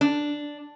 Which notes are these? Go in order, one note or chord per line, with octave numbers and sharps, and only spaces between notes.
D4